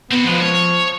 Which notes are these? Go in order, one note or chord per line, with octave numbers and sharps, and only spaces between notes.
B3 C4 F#4
F3 G#3 B4
C#5